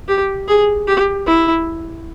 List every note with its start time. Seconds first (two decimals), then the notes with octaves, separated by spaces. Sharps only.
0.08 G4
0.48 G#4
0.88 G4
1.26 E4